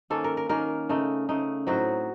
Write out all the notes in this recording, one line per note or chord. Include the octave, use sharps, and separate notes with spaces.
D#3 A#3 C#4 A4
A#4
A#4
D#3 A#3 C#4 A#4
C#3 A3 D#4
C#3 A3 D#4
A2 F#3 C4 D#4 F#4